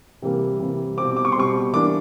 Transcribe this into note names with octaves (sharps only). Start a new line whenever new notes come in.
C3 E3 G3 A#3
C3 E3 G3 A#3
B2 G3 C4 D6
D6
C#6
C6
B2 G3 C4 C#6
E3 G3 A#3 D4 D6